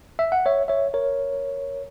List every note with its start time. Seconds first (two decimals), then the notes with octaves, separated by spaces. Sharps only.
0.19 E5
0.32 F#5
0.46 C#5 E5
0.68 C#5 E5
0.94 A#4 C#5